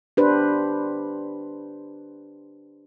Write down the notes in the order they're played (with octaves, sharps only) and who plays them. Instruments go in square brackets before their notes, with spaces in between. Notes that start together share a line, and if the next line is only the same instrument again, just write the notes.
[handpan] D4 G4 B4 C5